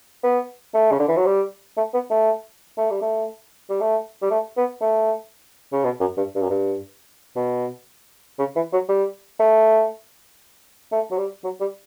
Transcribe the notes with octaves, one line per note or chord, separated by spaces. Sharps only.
B3
A3
C#3
D3
E3
F#3
G3
A3
B3
A3
A3
G3
A3
G3
A3
G3
A3
B3
A3
C#3
B2
F#2
G2
G2
F#2
G2
B2
C#3
E3
F#3
G3
A3
A3
F#3
G3
F#3
G3